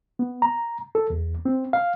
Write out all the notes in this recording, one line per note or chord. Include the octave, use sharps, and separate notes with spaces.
B3
A#5
A4
E2
C4
F5